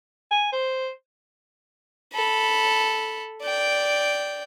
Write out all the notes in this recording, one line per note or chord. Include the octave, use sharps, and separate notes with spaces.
G#5
C5
A4 B5
D5 G5